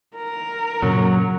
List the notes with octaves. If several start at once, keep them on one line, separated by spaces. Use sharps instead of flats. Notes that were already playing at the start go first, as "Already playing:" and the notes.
A#4
F#2 A#2 C#3 F#3